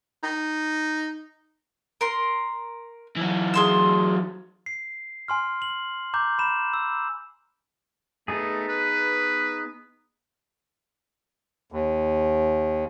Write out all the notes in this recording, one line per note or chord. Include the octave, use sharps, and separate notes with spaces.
D#4
A#4 C6
E3 F#3
G#4 C6 E6
C7
G#5 C6 F6
F#7
A#5 D6 G6
B5 E7
E6
A3 B3 D#4 G#4
B4
D#2